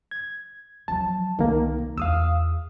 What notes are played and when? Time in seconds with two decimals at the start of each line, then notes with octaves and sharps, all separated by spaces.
0.11 G#6
0.88 F3 F#3 A5
1.39 C2 D#3 A#3
1.98 E2 F5 D#6 E6